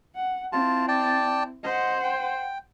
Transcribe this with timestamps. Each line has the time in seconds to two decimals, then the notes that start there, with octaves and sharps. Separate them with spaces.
0.16 F#5
0.52 C4 E4 F4 A5
0.88 D5 G5 A5
1.64 C5 D#5 F#5
2.04 G5